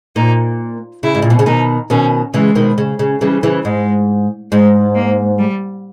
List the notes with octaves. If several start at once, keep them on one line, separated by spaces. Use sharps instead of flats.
A#2 D#4
C#3 E4
G#2
A#2
B2
C#3
B2 D#3 D#4
B2 D#3 C#4
C#3 E3 G#3
B2 D#3
C#3
C#3
C#3 E3 G3
C#3 E3
G#2 G#3
G#2 G#3
A#3
G3